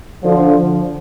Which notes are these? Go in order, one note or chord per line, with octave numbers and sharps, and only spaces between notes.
D3 F3